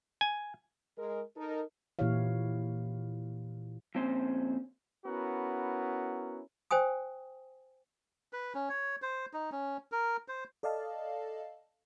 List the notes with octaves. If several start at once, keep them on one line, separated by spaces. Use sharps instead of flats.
G#5
G#3 A#4
D#4 A4 A#4
A#2 E3 E4 G4 C#5 F5
F2 A#2 C4 C#4 C5
B3 C#4 E4 F#4 A#4
C5 G5 G#5 D#6
B4
C#4
C#5
C5
D#4
C#4
A#4
C5
A4 D5 D#5 F5 A5